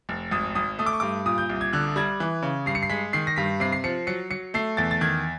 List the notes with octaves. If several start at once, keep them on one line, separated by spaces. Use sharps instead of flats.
F1
G#1 D#6
G#1 D#6
A3 D#6
D6
C#6
G2 D6
A#2 D#6
G6
C2
G#6
D3 F#6
G3 G#6
E3
C#3
G2 C7
C#7
C7
G#3 B6
D#3 C7
A#6
G2 B6
C3 C7
C7
F3 C#7
F#3 C#7
F#3 C#7
A3 C7
E2 A6
A6
D#3 G#6